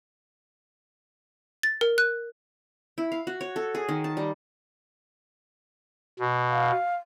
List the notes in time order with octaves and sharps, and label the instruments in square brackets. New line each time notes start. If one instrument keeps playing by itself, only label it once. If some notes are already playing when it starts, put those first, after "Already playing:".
[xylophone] A6
A#4
F#6
[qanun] E4
F5
F#4
C#5
A4
G#4
D#3
A5
G3
[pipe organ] B2
[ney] F5